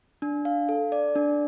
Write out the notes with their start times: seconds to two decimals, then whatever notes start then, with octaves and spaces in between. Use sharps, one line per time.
0.22 D4
0.45 F5
0.69 A4
0.92 D5
1.15 D4